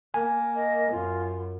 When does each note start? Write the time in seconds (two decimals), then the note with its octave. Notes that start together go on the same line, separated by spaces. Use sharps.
0.14 A#3 G#5
0.56 D#5
0.91 F#2 F4